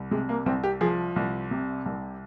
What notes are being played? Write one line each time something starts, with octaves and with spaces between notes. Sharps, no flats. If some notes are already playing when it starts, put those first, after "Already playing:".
Already playing: C2
C3 G#3
A#3
C2 C4
G4
F3 G#4
C2
C3
C2